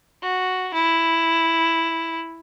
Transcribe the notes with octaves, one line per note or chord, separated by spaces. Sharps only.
F#4
E4